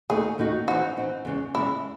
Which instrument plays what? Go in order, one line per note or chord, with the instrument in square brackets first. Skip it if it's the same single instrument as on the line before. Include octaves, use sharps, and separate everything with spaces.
[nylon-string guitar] D#2 D#3 A3 D#4 F#4 [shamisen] G#4
[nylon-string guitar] D#2 D#3 A3 D#4 F#4
[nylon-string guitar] E3 C4 D#4 [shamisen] F#4
[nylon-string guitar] E3 C4 D#4
E2 C#3 G#3
[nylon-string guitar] E2 C#3 G#3 [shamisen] E4